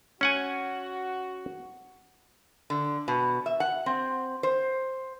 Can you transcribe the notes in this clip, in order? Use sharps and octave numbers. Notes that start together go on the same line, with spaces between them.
C#4 F#4 F#5 G#5
D3
B2
E5
F#5
C4
C5